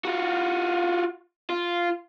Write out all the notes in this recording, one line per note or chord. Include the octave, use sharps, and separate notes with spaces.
F4 F#4
F4